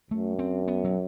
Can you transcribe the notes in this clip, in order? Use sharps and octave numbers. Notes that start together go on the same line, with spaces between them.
F#2 A3
C4
B3
F#3